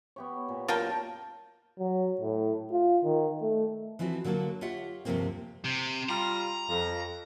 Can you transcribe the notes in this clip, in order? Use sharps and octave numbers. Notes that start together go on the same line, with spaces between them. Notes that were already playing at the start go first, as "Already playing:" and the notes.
B3 G4 C#5
A#2
F#2 F4 A#4 G5 A5 F6
F#3
A2
F4
D#3
A3
E3 F3 C4 E4 F#4
D3 F#3 A#3 F#4 A4
F4 G4 C#5 E5 F#5
D2 G2 C3 F3 A#3 C4
C3
G3 F4 A#5
F2